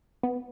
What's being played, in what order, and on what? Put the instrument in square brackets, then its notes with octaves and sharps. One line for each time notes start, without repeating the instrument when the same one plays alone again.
[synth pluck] B3